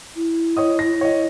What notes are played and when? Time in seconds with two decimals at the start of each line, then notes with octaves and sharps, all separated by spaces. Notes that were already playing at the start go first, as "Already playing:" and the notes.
0.16 E4
0.57 C#5 D#5 D#6
0.79 A#6
1.01 C#5 D#5